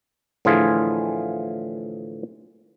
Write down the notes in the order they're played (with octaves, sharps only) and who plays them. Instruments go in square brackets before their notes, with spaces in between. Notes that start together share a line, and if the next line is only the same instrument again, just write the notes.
[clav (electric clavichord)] A2 D3 E3 F3 F4 G#4